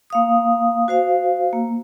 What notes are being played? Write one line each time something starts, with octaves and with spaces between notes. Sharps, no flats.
A#3 F5 D#6
F#4 C5 F5
A#3